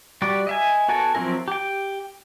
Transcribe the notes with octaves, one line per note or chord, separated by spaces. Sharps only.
G3 F#4 G4 D5
D#5 E5 G#5
B3 F#4 A4 A#4 G#5
F3 F#3 C4 E4 A#4
G4 G5